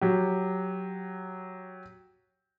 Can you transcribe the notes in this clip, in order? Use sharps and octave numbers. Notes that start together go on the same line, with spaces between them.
F#3 G4